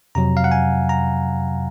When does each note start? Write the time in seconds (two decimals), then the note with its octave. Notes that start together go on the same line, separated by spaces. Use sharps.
0.15 F2 C3 F#3 A#5
0.37 F5
0.44 F#5
0.52 G#5
0.89 A#5